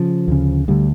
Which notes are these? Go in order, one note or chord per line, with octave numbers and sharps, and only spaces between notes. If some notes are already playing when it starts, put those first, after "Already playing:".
Already playing: C#3 F3
D2 C#3
D2 D3 G3